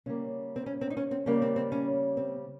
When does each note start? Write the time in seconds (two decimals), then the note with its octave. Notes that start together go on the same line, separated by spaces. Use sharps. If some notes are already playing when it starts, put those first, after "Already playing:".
0.06 C#3 G3 A#3 C#4
0.56 C4
0.66 C#4
0.81 C4
0.90 D#4
0.97 C#4
1.11 C4
1.26 C#3 G3 A#3 C#4
1.42 C4
1.56 C4
1.72 C#4
2.17 C4